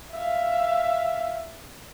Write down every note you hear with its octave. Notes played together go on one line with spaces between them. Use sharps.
E5 F5